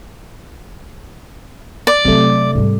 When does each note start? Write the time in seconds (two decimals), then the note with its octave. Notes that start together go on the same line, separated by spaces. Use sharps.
1.87 D5
2.05 C3 F#3 A3 B3
2.55 G#2 G3